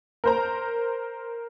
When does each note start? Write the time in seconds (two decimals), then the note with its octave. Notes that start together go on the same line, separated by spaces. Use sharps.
0.24 A#4 C5 A#5